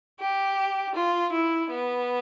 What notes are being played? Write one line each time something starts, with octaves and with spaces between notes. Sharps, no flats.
G4
F4
E4
B3